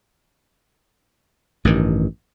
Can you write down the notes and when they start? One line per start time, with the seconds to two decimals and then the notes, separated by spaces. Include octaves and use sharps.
1.65 A1 G2 D#3